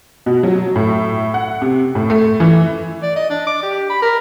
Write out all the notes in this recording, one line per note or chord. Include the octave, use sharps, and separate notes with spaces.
B2
F#3
A2
F#5
C3
A2
A3
E3
D5
D#5
D4
D6
G4
B5
A#4